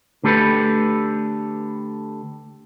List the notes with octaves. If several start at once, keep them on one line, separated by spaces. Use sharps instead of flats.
D3 A3 G4 A4 B4